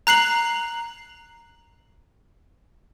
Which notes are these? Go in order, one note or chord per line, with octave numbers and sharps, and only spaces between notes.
A#5 F#6 C7 F#7